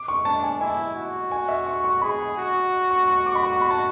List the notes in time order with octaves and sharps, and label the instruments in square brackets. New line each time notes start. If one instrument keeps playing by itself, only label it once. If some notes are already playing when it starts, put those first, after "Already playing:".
Already playing: [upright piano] D6
C#6
[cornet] D4 [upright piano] A5
[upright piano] G#5
[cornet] E4 [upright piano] G#5
[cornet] F#4
[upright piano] G#5
E5
C#6
C#6
[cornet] G#4 [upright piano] B5
[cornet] F#4
[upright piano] C#6
C#6
D6
B5
C#6
B5
A5